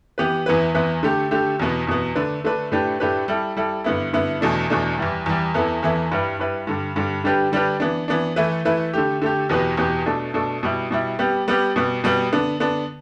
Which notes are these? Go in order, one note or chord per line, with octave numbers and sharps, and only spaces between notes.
E3 B3 G4 B4
E2 E3 B3 E4 B4
E2 E3 B3 E4 B4
D3 A3 G4
D3 A3 G4
E2 B2 B3
E2 B2 B3
D3 A3 D4 B4
D3 A3 D4 B4
A2 A3 D4 G4 B4
A2 A3 D4 G4 B4
G3 E4 A4
G3 E4 A4
G2 D3 B3 E4
G2 D3 B3 E4
E2 B2 A3 D4
E2 B2 A3 D4
E2 E3 G3
E2 E3 G3
E2 E3 B3 E4 A4
E2 E3 B3 E4 A4
G2 G3 E4 B4
G2 G3 E4 B4
G2 D3 G3
G2 D3 G3
D3 G3 D4 G4 B4
D3 G3 D4 G4 B4
E3 B3 D4
E3 B3 D4
E3 A3 E4 B4
E3 A3 E4 B4
D3 A3 G4
D3 A3 G4
E2 B2 B3 G4 B4
E2 B2 B3 G4 B4
B2 A3 D4 A4
B2 A3 D4 A4
B2 G3 E4
B2 G3 E4
G3 B3 G4
G3 B3 G4
B2 G3 B3
B2 G3 B3
D3 B3 D4
D3 B3 D4